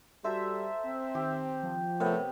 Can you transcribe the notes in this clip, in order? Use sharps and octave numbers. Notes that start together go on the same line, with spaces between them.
G3 F#4 A4 C5 E5 A5 A#5
C4
D#3 G4
F3
C3 A3 B3 A#4 B4 C#5